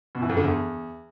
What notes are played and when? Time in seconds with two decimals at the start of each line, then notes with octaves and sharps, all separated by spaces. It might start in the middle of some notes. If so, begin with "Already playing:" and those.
0.15 B2
0.22 E3
0.29 F2
0.37 D3
0.44 E2